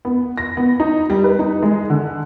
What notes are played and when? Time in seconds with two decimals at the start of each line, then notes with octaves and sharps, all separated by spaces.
0.05 B3
0.38 A#6
0.57 B3
0.80 D#4
1.10 G3
1.24 B4
1.39 D#4
1.62 G#3
1.90 D3